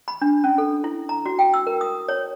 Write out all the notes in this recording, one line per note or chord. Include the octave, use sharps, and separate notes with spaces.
B5
D4
C#4
A4
E4
A#5
F#4
G5
E6
A#4
D#6
C#5